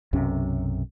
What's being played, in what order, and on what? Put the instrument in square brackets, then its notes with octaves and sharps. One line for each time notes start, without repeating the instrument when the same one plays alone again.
[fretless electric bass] B1 F#2 C3 C#4